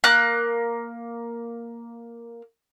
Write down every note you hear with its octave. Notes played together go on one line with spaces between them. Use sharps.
A#3 F#6